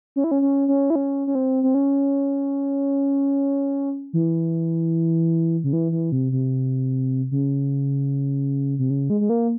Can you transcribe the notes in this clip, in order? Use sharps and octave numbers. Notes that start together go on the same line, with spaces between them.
C#4
E4
C#4
C#4
C#4
E4
C#4
C#4
C4
C4
C#4
E3
C#3
E3
E3
C3
C3
C#3
C3
C#3
G#3
G#3
A#3